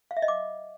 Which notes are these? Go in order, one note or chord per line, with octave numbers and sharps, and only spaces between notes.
F5
E5
D#5
D6